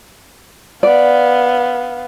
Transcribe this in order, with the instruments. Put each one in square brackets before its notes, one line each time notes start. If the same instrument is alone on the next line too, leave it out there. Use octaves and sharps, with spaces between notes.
[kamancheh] B3 F5 [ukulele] D5